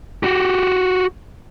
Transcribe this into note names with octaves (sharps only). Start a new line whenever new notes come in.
F#4 G4